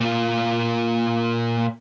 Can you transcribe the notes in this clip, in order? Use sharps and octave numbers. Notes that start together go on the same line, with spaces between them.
A#2 F4